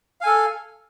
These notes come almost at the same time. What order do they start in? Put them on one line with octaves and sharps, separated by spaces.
F5 G#5 A4